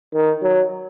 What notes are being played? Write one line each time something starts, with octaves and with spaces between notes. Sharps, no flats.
D#3
F#3